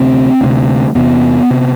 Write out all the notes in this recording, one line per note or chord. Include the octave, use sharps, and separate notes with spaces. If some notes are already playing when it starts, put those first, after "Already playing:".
Already playing: D2 C3 C4
D2 C3
E2 C3 B3
C3